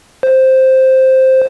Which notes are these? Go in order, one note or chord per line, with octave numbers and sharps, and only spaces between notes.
C5